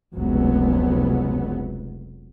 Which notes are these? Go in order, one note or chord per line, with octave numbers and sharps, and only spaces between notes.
F1 C#2 F#3 B3